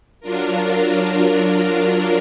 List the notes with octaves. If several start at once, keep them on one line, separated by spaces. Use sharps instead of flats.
F#3 D4 F4 A#4